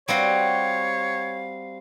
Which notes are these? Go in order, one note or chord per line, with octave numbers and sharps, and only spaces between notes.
G3 C4 F#4 C#5 F5